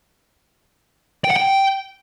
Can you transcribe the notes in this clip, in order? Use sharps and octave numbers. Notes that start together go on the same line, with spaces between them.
G5
F#5
G5